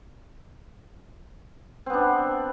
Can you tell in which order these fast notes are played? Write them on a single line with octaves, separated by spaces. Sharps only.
C4 B3 D4